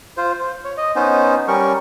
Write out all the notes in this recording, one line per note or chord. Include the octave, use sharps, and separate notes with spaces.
F4 C5
C5
C#5
D#5
B3 C#4 D#4 C5
G3 C#4 A#4 C#6